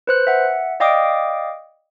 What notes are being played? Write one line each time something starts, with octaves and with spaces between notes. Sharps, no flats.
B4 C5 F#6
E5 F#5
D5 D#5 F5 G5 D6 D#6